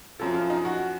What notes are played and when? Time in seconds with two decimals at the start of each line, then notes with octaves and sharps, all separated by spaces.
0.19 F#2 F3 A4
0.35 F4
0.50 D#4
0.65 F#4